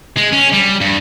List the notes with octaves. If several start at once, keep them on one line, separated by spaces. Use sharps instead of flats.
G#3
C#4
G3
G2